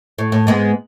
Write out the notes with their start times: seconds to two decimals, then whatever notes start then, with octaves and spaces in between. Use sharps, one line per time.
0.18 A2
0.32 A2
0.47 G#2 G#3 B3